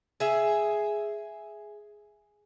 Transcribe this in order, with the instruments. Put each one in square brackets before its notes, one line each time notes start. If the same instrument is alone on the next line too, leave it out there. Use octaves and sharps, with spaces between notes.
[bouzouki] G#4 E5